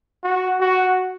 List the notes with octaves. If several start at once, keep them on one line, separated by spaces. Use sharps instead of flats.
F#4
F#4